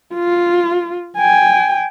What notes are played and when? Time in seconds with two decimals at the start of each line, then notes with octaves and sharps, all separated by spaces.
0.15 F4
1.17 G5 G#5